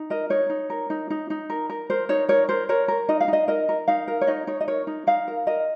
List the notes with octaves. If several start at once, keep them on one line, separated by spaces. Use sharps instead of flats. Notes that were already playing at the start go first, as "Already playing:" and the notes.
Already playing: D#4
A#4 D#5
D#4 C#5
D#4
A#4
D#4
D#4
D#4
A#4
A#4
A#4 C5
D#4 C#5
A#4 C#5
A#4 C5
A#4 C#5
A#4
D#4 D#5
F5
D#4
D#5
A#4 D#5
A#4
D#4 F5
A#4
C#5
D#4 D#5
D#4 C#5
D#5
A#4 C#5
D#4
D#4 F5
A#4
A#4 D#5